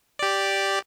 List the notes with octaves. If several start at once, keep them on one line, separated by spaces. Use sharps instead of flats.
G4 D5